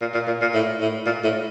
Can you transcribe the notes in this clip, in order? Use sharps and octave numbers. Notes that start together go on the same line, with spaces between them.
A#2
A#2
A#2
A#2
A2
A2
A#2
A2